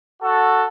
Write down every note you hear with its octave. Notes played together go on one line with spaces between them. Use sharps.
F#4 A4